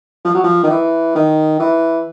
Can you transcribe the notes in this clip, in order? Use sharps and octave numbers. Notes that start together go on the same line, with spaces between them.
F3
F#3
F3
D#3
E3
D#3
E3